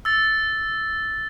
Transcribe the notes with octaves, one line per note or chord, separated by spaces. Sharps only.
E6 A6